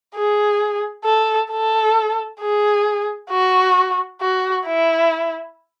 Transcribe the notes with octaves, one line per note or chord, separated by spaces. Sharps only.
G#4
A4
A4
G#4
F#4
F#4
E4